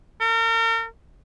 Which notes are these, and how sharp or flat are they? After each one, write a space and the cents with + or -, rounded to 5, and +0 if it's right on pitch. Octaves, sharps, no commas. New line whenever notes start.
A#4 -40